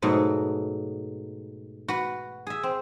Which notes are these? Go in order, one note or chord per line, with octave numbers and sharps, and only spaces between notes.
G#2 B2 F#3 A3
F#4 B4
G#4 E5
C4